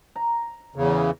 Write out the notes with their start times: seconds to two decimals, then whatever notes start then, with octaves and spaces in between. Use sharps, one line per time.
0.16 A#5
0.76 E2 C#3